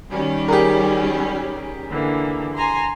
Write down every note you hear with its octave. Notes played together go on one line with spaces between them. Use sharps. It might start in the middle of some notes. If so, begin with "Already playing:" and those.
D#3 G3 C#4
G4 G#4 A#4
D3 E3 A#3
G#5 A#5 C6